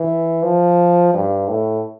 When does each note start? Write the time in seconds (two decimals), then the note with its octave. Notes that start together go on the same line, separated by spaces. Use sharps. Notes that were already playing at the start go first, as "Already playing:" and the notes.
Already playing: E3
0.43 F3
1.14 G2
1.48 A2